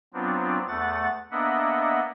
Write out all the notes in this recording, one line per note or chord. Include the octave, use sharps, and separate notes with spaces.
F#3 B3 C4 D4 F4
E2 A3 F#5 A6
A#3 B3 D4 D#5 E5 F#5